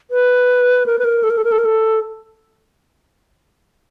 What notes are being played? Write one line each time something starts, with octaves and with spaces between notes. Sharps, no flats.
B4
A#4
B4
A#4
A4
A#4
A4
A#4
A4
A#4
A4